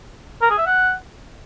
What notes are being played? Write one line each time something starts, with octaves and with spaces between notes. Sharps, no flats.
A#4
G#4
E5
F#5